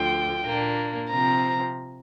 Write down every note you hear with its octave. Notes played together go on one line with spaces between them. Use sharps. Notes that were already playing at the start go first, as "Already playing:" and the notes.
Already playing: D2 D3 F3 G5
A#2 A#3 D4
C3 F3 C4 A#5